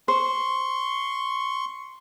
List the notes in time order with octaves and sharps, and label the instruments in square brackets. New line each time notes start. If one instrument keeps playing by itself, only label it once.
[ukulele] C5 [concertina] C6 C#6